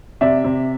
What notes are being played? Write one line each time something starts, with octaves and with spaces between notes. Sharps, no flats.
C3 D5 E5
C3